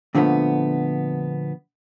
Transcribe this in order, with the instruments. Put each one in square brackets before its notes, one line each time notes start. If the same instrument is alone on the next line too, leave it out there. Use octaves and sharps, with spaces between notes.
[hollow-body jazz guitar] A#2 D3 F3 A3 B3